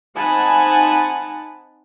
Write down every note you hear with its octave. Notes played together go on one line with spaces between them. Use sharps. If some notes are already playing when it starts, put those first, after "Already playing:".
C4 D#4 F#5 G#5 A5 B5